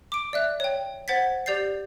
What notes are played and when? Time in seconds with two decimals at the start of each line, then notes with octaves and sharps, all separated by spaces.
0.12 D6 D7
0.33 D5 E5 F#6
0.60 C#5 G5
1.08 C5 F#5 G#6 A6 B6
1.46 G4 D5 G6 A6 C7